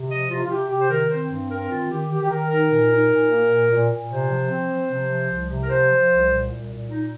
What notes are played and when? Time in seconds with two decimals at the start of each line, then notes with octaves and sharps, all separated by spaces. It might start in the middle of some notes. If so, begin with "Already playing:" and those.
Already playing: C3
0.10 F3 D#5
0.31 C3 F4
0.43 F4
0.50 C3 G4
0.70 C3 G4
0.81 C5
0.90 D#3 A#4
1.10 C4 C5
1.30 G2
1.50 C4 A#4
1.70 D#3 F4
1.90 D#3 G4
2.10 D#3 G4
2.22 G4
2.30 D#3 A#4
2.50 D#4 A#4
2.70 A#2
2.91 D#4
3.10 A#2
3.30 A#3
3.50 A#2
3.70 A#2
3.89 A#2
4.10 C3 C5
4.30 F3
4.49 C4
4.70 F3
4.90 C3
5.10 F3
5.30 C2
5.50 C3
5.63 A#4
5.69 F3 C5
5.90 F3
6.09 C2
6.30 A#2
6.50 C2
6.70 A#2
6.89 D#4